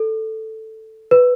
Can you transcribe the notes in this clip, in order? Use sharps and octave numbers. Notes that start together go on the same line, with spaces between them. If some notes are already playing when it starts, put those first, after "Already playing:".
Already playing: A4
B4